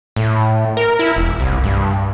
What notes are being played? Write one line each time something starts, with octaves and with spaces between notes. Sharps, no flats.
A2
A#4
E4
E1
C2
G2